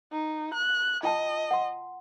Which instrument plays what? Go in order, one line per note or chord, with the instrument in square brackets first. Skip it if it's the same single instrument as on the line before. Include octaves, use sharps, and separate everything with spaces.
[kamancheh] D#4
F#6
[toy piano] F4 G5 A5 [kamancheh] D#5
[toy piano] F#5 C6